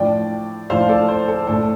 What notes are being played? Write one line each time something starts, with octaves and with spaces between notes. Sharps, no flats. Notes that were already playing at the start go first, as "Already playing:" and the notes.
Already playing: A2 F3 D4 D5 G5
A2 F3 D4 C5 F5
A4 D5
C5
A4
A2 A3 D4 A4